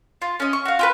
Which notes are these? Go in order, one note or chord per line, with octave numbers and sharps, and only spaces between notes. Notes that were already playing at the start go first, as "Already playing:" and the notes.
F4
C#4 D#5
C#6
F#4 F5
F4 G4 B4